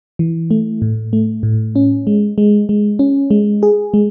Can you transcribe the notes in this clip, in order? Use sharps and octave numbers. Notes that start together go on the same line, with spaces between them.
E3
A3
A2
A3
A2
C#4
G#3
G#3
G#3
C#4
G#3
G#4
G#3